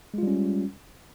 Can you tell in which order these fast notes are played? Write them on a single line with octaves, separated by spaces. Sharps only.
G#3 F4 G3 C#4